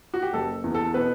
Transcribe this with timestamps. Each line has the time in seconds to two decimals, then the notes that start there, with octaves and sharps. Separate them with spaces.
0.14 F#4
0.22 G4
0.33 F#1 A4
0.64 E2
0.75 A4
0.94 B2 B4